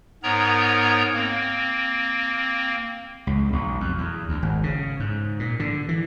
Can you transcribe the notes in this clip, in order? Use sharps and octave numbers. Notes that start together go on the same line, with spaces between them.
G#2 B3 A#4 C#5 A#5
A#3 C4
C#2
B1
F2
E2
D2
G#1
C#3
G#2
A#2
D3
E3